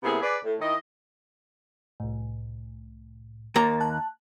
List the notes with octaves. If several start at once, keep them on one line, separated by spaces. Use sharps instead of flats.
C3 A#3 B3 E4 G#4
G#4 B4 D5
A2
D#3 E4 D#5
C2 A2
D#2 A#3 A#5 A6
A5 F#6